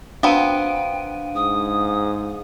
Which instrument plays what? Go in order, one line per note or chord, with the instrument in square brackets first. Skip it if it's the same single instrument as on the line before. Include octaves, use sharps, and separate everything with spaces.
[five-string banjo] B3 C4 [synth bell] D4 F5 D#7 [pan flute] G5
[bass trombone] G#2 [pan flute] D#6